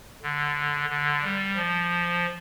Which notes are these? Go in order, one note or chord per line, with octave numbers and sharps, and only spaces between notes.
D3
D3
G3
F3